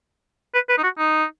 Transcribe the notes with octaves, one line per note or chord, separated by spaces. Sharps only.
B4
B4
D#4
F#4
D#4